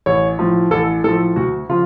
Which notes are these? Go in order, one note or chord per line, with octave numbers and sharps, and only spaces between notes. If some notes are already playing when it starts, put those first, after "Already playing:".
A1 C#5
A2 F3
A1 A4
A2 F3 A4
D2 F#4
C#3 F3 F4